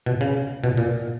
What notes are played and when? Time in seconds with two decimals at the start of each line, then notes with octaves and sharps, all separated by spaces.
0.06 B2
0.21 C#3
0.64 B2
0.77 A#2